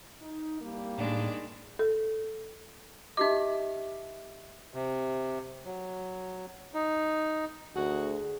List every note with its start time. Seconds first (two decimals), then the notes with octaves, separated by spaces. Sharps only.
0.20 D#4
0.61 C2 G3 A#3
0.98 A2 D#3 G#3 D4
1.79 A4
3.17 D#4 G4 D#5 E5 D6
4.74 C3
5.65 F#3
6.74 D#4
7.76 D2 F#4 G#4